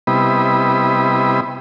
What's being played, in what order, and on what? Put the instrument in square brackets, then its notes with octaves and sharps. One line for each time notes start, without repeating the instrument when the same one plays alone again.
[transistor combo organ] C3 G3 B3 E4 D#5 B5